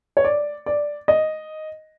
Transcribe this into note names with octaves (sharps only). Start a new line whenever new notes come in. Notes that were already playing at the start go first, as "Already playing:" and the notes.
C#5
D5
D5
D#5